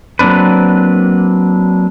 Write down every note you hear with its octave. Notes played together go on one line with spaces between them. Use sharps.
F#3 A#3 C4 D4 B4